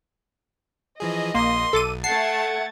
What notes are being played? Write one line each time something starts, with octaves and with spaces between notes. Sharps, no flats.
E3 F3 G#4 D#5
A#1 A#3 C6 D#6
B1 A4 D6 D#7
A3 F#5 A5 G#6 A6 C7